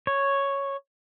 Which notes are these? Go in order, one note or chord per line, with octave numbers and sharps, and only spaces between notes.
C#5